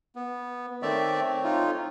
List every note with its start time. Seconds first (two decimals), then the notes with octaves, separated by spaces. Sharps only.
0.16 B3
0.82 D#3 A3 C4 C#5 D5 E5
1.44 D#4 F4